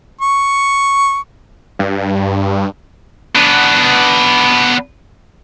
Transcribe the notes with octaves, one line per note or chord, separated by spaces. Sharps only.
C#6
G2
B3 D4